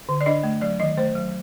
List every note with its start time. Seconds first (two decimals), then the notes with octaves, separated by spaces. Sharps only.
0.09 D3
0.21 D5
0.26 D4 D#5
0.43 A3
0.61 F#3 D5
0.80 D#3 D#5
0.97 A3 C5
1.15 F#3